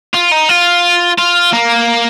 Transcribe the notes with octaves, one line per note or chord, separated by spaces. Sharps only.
F4
D#4
F4
F4
A#3